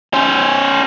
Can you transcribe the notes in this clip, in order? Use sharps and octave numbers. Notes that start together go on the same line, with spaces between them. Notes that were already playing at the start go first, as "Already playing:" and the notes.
C#4 C5